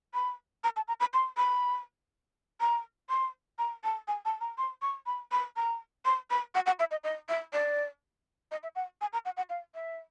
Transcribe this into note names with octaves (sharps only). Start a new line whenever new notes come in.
B5
A#5
A5
A#5
B5
C6
B5
A#5
C6
A#5
A5
G#5
A5
A#5
C6
C#6
B5
B5
A#5
C6
B5
F#5
F#5
E5
D#5
D#5
E5
D5
D#5
E5
F#5
G#5
A#5
F#5
F#5
F5
E5